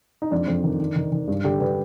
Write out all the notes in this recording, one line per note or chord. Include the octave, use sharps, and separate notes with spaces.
D#4
F2 D4
F2
D#3
D#3
D#3
D#3
G2
D3 G4
D3 B4